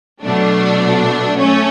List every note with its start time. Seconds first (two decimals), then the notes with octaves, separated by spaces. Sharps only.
0.23 B2 F#3 A3 D4
1.38 A3 C#4